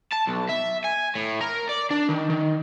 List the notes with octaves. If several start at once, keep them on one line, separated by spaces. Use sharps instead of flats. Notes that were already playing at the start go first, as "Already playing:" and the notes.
A5
B1
E5
G#5
A2
A#4
D5
D4
D#3
D#3